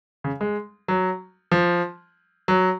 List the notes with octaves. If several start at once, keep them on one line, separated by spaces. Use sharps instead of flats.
C#3
G#3
F#3
F3
F#3